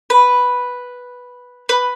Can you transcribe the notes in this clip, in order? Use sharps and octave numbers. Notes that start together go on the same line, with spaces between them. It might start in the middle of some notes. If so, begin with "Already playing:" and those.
B4
B4